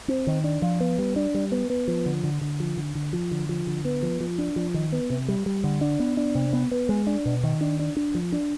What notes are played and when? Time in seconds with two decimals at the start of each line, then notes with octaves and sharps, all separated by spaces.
0.08 C4
0.27 D#3
0.44 D4
0.62 F3
0.80 B3
0.98 G3
1.16 D4
1.35 G3
1.52 B3
1.70 B3
1.88 F3
2.06 D3
2.24 D3
2.41 D3
2.60 F3
2.77 D3
2.95 D3
3.13 F3
3.31 D3
3.49 F3
3.67 D3
3.85 B3
4.03 F3
4.21 F3
4.38 D4
4.56 F3
4.74 D#3
4.92 B3
5.10 C3
5.28 G3
5.46 G3
5.64 D3
5.81 D4
6.00 B3
6.17 D4
6.35 C3
6.53 B3
6.71 B3
6.89 G#3
7.07 D4
7.26 B2
7.44 D#3
7.61 D4
7.79 D4
7.97 D4
8.15 F3
8.32 D4